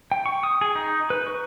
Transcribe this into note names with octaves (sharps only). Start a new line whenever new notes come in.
G5
C#6
D#6
G#4
D#4
B4
C#6